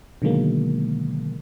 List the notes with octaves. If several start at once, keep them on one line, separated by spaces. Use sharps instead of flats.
B2 D3 D#3 F#3 G#3 A#3